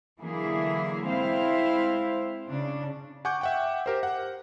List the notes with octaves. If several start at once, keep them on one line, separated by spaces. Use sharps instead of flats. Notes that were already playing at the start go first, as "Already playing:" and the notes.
D3 E3 F#3 A#3 E4 G#4
G#3 C4 E4 C5 F5
C#3 D4
F#5 G#5 C#6 D6 G6
E5 F#5 G5
G4 A#4 C5
F#5